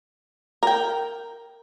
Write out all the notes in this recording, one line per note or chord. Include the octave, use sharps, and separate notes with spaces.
A#4 G5